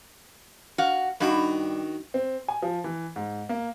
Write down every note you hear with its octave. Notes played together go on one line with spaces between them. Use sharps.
F#4 F5
G2 D#3 F#4
C4
G#5
F3
E3
G#2
A#3